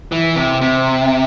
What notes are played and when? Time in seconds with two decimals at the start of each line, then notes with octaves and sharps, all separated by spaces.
0.12 E3
0.35 C3
0.61 C3